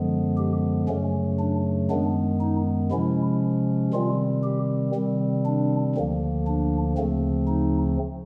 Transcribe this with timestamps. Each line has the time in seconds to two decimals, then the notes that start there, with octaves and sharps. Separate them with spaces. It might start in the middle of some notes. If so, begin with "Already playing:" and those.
Already playing: F#2 D3 F3 G#3 B3
0.38 G4
0.88 F#2 C#3 F#3 A3 C#4
1.39 D4
1.90 F#2 D#3 G#3 B3 D4
2.41 D#4
2.91 C3 F3 G#3 C#4 E4
3.93 C3 D#3 G3 C4 F4
4.44 G4
4.94 C3 D#3 G3 C4
5.45 D4
5.95 D2 D3 F3 A#3
6.47 D4
6.97 D2 C#3 F3 A3 C4
7.48 D#4